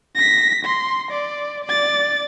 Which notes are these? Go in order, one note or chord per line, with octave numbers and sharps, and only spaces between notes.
A#6 B6
C6
D5
D5 A6